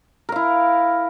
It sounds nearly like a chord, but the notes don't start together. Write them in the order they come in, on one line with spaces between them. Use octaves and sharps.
A#4 F5 E4